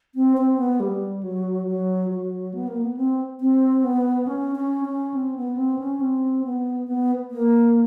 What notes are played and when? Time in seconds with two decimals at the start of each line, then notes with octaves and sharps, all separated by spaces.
0.15 C4
0.37 C4
0.58 B3
0.80 G3
1.23 F#3
1.67 F#3
2.10 F#3
2.54 B3
2.68 A#3
2.82 B3
2.97 C4
3.40 C4
3.84 B3
4.27 C#4
4.56 C#4
4.85 C#4
5.14 C4
5.36 B3
5.57 C4
5.79 C#4
6.00 C4
6.44 B3
6.88 B3
7.31 A#3